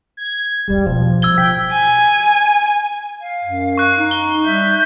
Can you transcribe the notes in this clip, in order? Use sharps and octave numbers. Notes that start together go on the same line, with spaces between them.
G#6
G#1 E2 G3
B2 F3
E6 G#6 G7
A1 C#3 G5 B6
G#5
F5
F#2
C#6 F#6
D#4
G7
G3 E5 G6